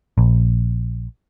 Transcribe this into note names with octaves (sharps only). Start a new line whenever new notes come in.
A#1